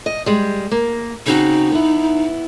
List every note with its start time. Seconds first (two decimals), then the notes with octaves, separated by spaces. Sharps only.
0.06 D#5
0.26 G3 G#3
0.71 A#3
1.26 C#3 C4 D#4 F#4
1.72 B3 E4